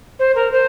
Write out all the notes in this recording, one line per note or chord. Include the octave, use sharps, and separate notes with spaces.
C5
A#4
C5